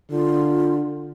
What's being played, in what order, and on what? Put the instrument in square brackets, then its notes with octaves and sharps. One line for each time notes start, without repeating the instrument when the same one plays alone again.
[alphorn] D3 [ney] F4